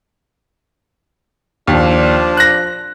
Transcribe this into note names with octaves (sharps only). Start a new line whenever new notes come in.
D#2 F3 D4
F#6 A#6